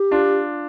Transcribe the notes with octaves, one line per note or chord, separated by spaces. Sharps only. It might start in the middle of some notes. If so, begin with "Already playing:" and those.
Already playing: G4
D4 F4